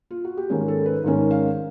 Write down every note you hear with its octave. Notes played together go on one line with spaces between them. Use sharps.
F4
F#4
G4
G#1 G#2 D#3 G#3 C#4 G#4
A4
B4
G#1 G#2 D#3 G#3 C#4
F5